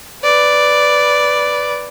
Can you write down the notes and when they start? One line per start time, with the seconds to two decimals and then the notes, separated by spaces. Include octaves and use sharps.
0.23 B4 D5